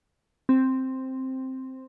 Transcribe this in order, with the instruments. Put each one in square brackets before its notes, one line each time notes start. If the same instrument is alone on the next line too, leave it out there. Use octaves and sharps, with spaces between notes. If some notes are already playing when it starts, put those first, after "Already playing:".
[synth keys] C4